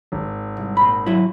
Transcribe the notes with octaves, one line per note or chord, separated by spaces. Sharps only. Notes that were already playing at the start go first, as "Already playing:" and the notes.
G#1
C2
A#2 B5
F#3 E4